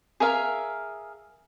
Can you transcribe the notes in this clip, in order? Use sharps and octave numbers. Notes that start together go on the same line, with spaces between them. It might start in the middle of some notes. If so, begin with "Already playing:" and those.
G#4 A#4 E5 F5